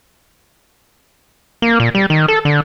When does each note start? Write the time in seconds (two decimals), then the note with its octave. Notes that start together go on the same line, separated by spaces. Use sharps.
1.62 A#3
1.80 A#2
1.95 G3
2.10 D#3
2.28 A4
2.45 D3